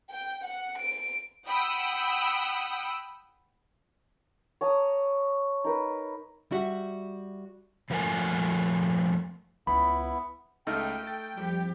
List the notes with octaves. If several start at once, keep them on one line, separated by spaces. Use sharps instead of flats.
G5
F#5
D7
F#5 G5 B5 D#6 E6
C#5 A5 A#5 D#6
D#4 A#4 B4
G3 E4 F#4 G4 E5 F#5
F2 F3 A3 A#4 F#5 G#5
C#2 B3 E4 B5
C#2 A3 D#4 D#5 G5 F6
A4 A6
F2 G3 G4